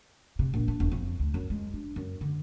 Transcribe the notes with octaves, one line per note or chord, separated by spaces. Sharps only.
C3
A#1
D4
E1
F2
D2
F#2
G#3
D4
F#2
D3